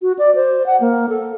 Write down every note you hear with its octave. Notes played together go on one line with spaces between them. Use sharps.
F#4
D5
C5
F#5
A#3
A4